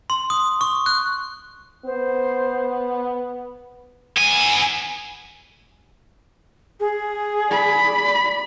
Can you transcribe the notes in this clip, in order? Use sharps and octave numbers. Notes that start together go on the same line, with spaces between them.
C6
D#6
C#6
F#6
B3 C5
B3 G#5
G#4
D5 B5